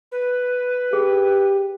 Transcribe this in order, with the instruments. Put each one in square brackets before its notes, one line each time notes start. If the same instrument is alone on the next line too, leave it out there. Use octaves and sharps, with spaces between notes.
[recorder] B4
[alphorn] G4 [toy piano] G#4